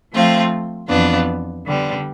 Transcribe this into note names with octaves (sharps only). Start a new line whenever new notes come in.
F3 A3 C4 F4
F2 E3 B3 D4 F4
D3 G3 B3